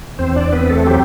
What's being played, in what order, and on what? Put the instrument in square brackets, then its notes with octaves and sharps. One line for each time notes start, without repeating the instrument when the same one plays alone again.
[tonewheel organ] E2 C4 C5
D4 D5
B3 C4 B4
A3 A4
F#3 G4